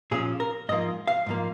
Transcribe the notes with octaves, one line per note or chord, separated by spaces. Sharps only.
A#2 F3 C#4 G#4
A#4
G#2 F3 A#3 D#5
F5
G#2 F3 A#3